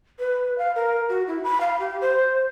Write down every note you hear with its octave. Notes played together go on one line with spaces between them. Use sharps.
B4
F5
A#4
F#4
E4
B5
F5
G4
C5